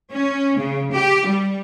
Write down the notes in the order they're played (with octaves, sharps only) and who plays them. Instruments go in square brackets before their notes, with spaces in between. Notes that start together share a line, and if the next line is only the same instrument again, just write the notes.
[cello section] C#4
C#3
G4
G3